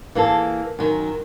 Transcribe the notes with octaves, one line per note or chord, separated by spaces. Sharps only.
E3 A#3 G#4 A4
F#2 D#3